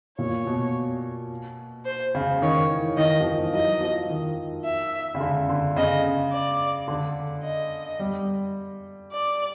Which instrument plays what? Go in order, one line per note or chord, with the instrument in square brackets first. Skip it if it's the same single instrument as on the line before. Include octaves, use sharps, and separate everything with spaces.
[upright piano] A#2 [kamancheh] C#5
[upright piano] B2
[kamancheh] C5
[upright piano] C#3
[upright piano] D#3 [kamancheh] C#5
[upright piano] E3
[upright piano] D#3 [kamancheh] D#5
[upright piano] F3
E3
[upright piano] F#3 [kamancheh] D#5
[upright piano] F3
D#3
[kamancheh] E5
[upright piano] C#3
D3
D3
[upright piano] C#3 [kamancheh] D#5
[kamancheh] D5
[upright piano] D3
[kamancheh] D#5
[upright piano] G3
[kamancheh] D5